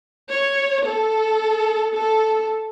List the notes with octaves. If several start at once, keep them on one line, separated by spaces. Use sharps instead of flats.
C#5
A4
A4